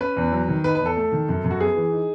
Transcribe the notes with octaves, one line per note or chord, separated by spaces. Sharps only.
C#4 B4
E2
F#3
D#3
D#4 B4
B4
E2
A4
A3
D#3
F#2
F#2
F#4
B3 G#4
E3
D#4